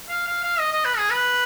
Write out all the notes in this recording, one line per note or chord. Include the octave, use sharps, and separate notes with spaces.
F5
F5
F5
D#5
D#5
B4
G#4
B4